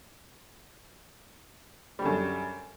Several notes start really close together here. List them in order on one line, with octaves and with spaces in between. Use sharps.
G3 D3 F#2